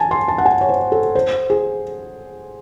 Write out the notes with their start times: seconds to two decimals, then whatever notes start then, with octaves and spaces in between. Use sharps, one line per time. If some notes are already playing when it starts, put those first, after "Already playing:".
Already playing: G#5 A5
0.11 C6
0.28 A5
0.38 F#5
0.46 G#5
0.61 C#5
0.69 C5
0.92 A4
1.15 C5
1.50 G#4